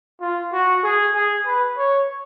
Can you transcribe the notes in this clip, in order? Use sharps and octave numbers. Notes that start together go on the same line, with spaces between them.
F4
F#4
G#4
G#4
B4
C#5